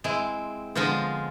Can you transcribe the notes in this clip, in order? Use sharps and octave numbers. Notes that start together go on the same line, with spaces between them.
G#3 C4 E4
D3 F3 G#3 B3 F4 C5